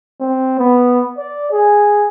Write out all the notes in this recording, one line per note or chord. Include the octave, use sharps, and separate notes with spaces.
C4
B3
D5
G#4